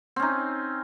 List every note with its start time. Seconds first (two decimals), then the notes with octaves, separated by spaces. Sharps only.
0.16 C4
0.19 C#4
0.22 D#4